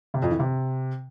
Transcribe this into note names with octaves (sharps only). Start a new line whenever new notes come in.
C3
F2
E3
C3